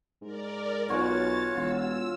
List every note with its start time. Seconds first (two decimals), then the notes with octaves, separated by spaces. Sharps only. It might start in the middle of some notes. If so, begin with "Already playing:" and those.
0.21 G#2 A#4 D5
0.89 B1 C#4 F4 F#4 C#5 A6
1.55 E1 F4 E6